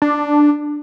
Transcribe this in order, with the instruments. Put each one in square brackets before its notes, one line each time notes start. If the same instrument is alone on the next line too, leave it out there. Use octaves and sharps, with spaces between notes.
[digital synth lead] D4